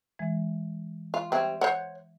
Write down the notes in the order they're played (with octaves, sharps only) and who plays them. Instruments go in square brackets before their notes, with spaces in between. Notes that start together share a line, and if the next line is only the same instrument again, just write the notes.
[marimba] E3 G#3
[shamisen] F4
[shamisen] G3 C4 [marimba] E5 C#6 G#6
[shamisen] C5 C#5 F#5